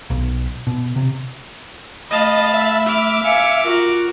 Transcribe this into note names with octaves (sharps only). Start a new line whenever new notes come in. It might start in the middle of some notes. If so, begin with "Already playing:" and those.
B1
B2
C3
A3 D#5 F5 A5 B5
E5
D6 F6
F5 G#5 C#7
F4 F#4 A#4